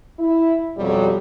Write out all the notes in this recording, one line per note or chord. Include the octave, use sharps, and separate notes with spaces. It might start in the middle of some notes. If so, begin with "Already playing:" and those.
E4
F2 B2 F#3 G3